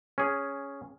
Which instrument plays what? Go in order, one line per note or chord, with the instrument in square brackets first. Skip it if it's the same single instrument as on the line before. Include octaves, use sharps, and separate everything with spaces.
[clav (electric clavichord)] C#4 G#4